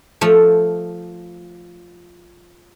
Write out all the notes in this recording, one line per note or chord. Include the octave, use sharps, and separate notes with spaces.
F3 A3